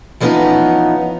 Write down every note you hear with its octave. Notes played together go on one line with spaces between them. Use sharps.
E3 F3 G3 B3 C#4 D#4